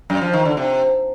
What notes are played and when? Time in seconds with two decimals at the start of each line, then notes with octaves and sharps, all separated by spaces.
0.10 F#2
0.22 F3
0.33 D#3
0.45 D3
0.57 C3